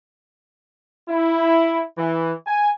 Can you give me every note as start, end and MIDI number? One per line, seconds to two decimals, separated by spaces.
1.09 1.83 64
1.98 2.33 52
2.47 2.69 80